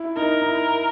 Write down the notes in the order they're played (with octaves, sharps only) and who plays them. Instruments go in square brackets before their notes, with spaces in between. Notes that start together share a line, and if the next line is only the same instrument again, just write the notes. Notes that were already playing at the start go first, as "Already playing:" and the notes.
Already playing: [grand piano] E4
[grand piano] D#4 [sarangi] A#4
[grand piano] D#4
E4